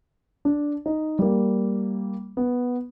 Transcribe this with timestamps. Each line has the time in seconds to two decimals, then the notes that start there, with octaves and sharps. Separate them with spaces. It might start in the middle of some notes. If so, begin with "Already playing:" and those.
0.45 D4
0.86 D#4
1.19 G3 A#3
2.37 B3